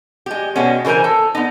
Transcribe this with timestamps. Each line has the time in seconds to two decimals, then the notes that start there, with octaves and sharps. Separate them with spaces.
0.26 G#3 G4
0.56 B2 G#3 B3 C#4
0.85 C#3 E3 A#4 C5 G#5
1.04 A4
1.35 B3 D#4